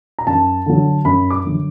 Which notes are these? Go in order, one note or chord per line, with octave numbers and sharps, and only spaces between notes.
A#5
F#2 A5
D3 F#3
F#2 B5
D6
D3 F#3